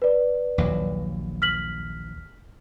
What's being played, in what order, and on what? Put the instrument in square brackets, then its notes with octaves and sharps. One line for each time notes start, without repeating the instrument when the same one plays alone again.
[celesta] B4 D5
[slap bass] A#1 D#2 F#3
[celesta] F6 B6 F#7